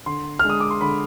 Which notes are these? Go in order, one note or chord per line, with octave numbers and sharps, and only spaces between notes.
D3 C6
G#3 D4 F6
D#6
D6
C6
D3 B5